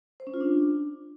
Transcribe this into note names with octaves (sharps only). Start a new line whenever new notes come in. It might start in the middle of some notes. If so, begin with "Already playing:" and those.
C5
C#4
F4
D4